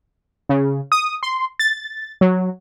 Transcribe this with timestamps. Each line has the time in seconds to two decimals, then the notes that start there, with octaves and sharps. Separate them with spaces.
0.49 C#3
0.92 D#6
1.23 C6
1.59 A6
2.21 F#3